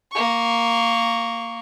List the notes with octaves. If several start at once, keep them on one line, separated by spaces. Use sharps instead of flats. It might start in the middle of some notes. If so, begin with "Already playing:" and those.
A#3 C#6